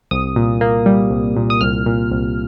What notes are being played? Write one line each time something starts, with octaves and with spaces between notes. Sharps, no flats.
C2 D#6
A#2
A#3
G3
C2
A#2
D#6
C2 F6
A#2
C2